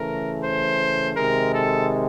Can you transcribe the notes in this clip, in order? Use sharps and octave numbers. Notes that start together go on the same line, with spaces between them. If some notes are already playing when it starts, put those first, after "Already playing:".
Already playing: C#3 E3 A3 A#4
C5
C3 D#3 G#3 A#4
A4